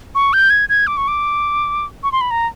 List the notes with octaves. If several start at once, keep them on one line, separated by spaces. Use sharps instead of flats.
C#6
G6
G#6
G#6
D6
C#6
D6
C#6
C6
B5
A#5